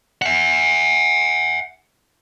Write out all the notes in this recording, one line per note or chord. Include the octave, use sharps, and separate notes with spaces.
E5 F#5